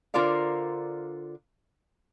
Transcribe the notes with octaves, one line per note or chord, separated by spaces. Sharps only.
D3 F4 A#4 C5 D5 F5